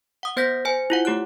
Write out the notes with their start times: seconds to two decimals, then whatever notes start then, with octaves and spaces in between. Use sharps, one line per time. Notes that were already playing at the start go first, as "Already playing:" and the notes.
0.23 F#5 D#6
0.37 B3 C5 G6 A#6 B6
0.65 C5 G#5
0.90 E4 F4 F#5
1.05 A3 G4 C#5 F#6